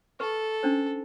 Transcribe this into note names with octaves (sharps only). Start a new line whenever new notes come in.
A4 B4 C#6
C#4 D4 C5